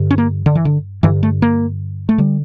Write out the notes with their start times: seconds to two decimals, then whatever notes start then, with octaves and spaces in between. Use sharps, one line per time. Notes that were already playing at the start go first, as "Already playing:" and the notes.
Already playing: G2 D3
0.11 C#4
0.18 A#3
0.46 D3
0.55 E3
0.65 D3
1.03 G2 D3 E3
1.23 A3
1.42 A#3
2.09 A3
2.18 D3 G3